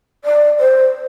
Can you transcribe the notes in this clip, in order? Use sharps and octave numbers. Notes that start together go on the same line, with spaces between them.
D5
C5